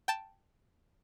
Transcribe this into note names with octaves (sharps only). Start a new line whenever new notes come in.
G5 A5